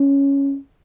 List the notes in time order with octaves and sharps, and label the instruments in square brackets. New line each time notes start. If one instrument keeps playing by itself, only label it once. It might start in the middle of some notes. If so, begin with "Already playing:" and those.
Already playing: [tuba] C#4